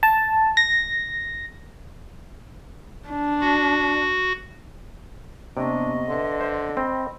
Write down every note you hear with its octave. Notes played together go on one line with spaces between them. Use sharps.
A5
A#6
D4
F#4
C3 A#3 B3 D4 D#5 C#6
D3 B4 E5 C6
C5
C4 G5 B5